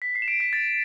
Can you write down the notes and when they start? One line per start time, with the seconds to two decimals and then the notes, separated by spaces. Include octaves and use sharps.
0.02 B6
0.15 C7
0.22 E7
0.28 D7
0.40 B6
0.53 A6